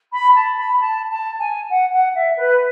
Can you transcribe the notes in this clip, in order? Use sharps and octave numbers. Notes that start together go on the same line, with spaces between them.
B5
A5
B5
A5
A5
G#5
F#5
F#5
E5
B4